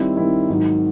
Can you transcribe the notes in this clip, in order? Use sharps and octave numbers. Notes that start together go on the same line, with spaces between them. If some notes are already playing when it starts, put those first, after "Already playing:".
Already playing: D#3 G3 C4 E4
D#3 G3 C4 E4
G#2 D#3 F#3